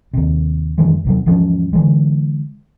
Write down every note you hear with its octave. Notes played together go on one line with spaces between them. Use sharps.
D#2 C3
F#2 D#3 E3 G#3
D#2 C3 F#3
E2 G#2 F3 C#4
D3 E3 G#3